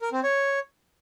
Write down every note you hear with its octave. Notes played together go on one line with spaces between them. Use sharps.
A#4
C4
C#5